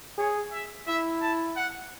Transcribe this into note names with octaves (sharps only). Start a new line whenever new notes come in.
G#4 C#5
E5
E4 E5
A5
F#5